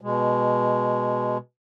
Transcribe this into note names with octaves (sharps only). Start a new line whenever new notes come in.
B2 G#3